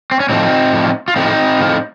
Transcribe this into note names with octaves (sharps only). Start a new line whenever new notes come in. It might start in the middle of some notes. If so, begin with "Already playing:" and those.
C4
C#4
A2 F3 C4 D#4
A2 F3
F4
A2 F3 C4 D#4
A2 F3